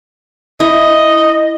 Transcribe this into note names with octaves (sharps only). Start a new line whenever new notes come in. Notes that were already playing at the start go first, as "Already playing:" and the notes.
E4 D#5